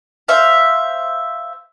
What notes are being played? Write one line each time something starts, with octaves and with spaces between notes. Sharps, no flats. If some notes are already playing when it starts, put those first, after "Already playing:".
C5 E5 F5